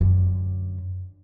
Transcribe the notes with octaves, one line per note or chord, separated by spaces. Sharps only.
F#2 D3